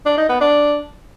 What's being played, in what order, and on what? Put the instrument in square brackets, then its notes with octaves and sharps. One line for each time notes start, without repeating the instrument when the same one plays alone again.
[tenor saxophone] D4
D#4
B3
D4